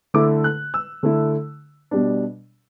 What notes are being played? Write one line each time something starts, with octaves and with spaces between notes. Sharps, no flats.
D3 A3 E4 D6
F#6
E6
D3 A3 E4
B2 G3 D4